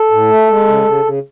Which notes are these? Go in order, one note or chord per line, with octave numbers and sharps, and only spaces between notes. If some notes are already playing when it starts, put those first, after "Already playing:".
Already playing: A4
A2
A3
G#3
C#3
C#3
C#3